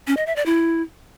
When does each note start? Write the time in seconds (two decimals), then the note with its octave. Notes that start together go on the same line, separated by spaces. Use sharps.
0.07 C#4
0.17 D#5
0.26 E5
0.36 D5
0.46 E4